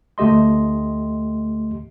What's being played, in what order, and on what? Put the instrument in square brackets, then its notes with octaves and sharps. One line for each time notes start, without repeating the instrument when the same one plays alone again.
[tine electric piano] D2 A3 G4 D#5 C6